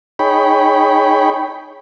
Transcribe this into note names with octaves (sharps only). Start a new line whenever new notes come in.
D#4 G#4 C#5 G5 B5